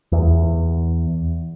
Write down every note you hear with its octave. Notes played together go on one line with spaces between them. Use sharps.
E2